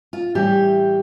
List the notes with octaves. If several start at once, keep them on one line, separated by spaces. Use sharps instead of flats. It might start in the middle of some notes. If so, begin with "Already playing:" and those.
F4
A2 E3 G3 G4